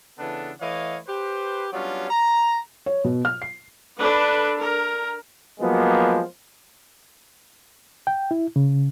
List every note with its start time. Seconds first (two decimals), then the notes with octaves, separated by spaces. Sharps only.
0.18 C#3 E3 B3 D4 A4
0.61 E3 A3 C#5 D#5 F5
1.07 G4 B4 C5
1.73 F#3 G3 B3 C#4 D4 F4
2.10 A#5
2.86 C#5
3.04 B2
3.25 F6
3.42 C7
3.98 D4 A4 B4
4.57 A#4
5.60 F3 F#3 G#3 A#3 B3
8.07 G5
8.31 E4
8.56 C#3